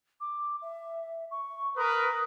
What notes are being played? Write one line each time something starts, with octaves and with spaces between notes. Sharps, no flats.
D6
E5
C#6
A#4 B4 D#6